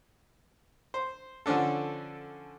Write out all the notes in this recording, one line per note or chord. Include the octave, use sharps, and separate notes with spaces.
C5
D3 F3 C#4 D4 A4